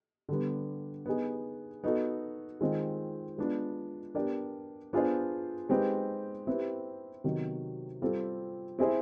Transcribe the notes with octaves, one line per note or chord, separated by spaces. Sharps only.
D3 G3 B3
B3 D#4 G#4
B3 D#4 F#4 A4
D#3 G#3 C4 F4
G#3 B3 D4 F4
B3 D4 G4 A#4 D5
B3 D4 F4 G#4 C5
G#3 C4 D#4 G4 B4
C4 E4 G4 B4
C3 D#3 F#3 B3
G3 C4 F4 A4
C4 E4 G#4 C5 E5